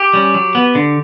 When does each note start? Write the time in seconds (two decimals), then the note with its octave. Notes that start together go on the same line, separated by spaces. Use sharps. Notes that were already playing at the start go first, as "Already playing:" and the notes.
Already playing: G4
0.13 G3 C#4
0.34 F#3
0.55 B3
0.75 D3